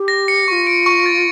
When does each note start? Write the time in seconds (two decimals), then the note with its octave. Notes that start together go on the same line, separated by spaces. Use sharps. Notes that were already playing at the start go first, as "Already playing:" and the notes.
Already playing: G4
0.08 A#6
0.28 C#7
0.48 G4 C#6
0.52 F4
0.67 D7
0.86 C#6
1.06 A6